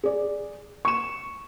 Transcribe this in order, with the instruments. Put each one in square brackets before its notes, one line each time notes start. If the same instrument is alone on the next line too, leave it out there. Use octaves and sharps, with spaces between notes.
[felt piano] G#4 D5
C#6 E7